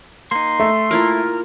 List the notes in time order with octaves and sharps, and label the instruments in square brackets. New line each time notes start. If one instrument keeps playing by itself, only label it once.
[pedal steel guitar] A#3 D#4 [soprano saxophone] C6
[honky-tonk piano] A3
[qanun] A#3 E4 F4 [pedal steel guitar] A#4